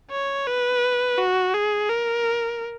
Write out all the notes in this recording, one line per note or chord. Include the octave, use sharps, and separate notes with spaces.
C#5
B4
F#4
G#4
A#4